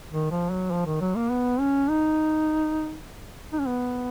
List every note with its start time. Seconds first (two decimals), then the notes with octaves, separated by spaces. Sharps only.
0.12 D#3
0.31 F3
0.51 F#3
0.71 F3
0.86 D#3
1.01 F#3
1.15 A#3
1.30 B3
1.60 C#4
1.90 D#4
3.53 D#4
3.60 C#4
3.67 B3